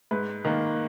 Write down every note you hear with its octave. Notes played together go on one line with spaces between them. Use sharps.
G#2 B4
D#3 A#3